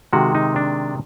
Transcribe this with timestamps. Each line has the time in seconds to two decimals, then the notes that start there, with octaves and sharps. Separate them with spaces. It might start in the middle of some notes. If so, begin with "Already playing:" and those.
0.13 C3 D#3 G#3 F#4
0.35 D#4
0.56 D4